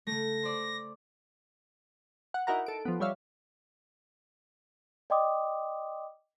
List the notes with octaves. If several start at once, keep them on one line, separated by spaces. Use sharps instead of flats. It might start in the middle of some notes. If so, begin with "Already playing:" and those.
C#3 A3 A#6
C5 D5
F#5
D#4 E4 F#4 A#4 F#5 A#5
A4 D7
F3 B3
G3 C#5 E5 F5
D5 D#5 G5 C6 D6 D#6